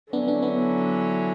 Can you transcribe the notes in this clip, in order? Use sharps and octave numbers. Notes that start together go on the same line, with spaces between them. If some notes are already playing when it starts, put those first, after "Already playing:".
D3 F#3 B3 C#4 D4 E4
B3 D4
B3 D4